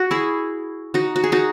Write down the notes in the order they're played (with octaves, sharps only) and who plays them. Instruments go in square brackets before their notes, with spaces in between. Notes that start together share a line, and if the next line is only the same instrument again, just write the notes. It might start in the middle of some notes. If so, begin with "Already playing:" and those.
Already playing: [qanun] F#4
E4 G#4
D#4 F#4
F#4
G#4
D#4 F#4